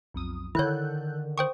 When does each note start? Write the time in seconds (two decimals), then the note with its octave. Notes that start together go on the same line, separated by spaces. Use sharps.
0.14 B1 F2 D#6
0.55 D3 D#3 E4 A4 C#5 F#6 G6
1.38 C5 G5 C#6 D#6